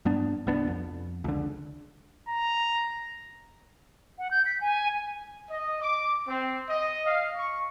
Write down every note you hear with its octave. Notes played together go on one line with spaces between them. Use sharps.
G2 B3 D4
C2 B3 D4
F2
C#2 D3
A#5
F#5
G6
B6
G#5
D#5
D6
C4
D#5
F5
C#6